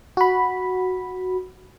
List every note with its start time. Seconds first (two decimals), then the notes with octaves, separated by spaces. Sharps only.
0.17 F#4 B5